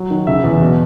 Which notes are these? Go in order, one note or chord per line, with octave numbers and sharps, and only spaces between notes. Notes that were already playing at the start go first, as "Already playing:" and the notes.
Already playing: F#3
D#3
C#3 E5
E2
B2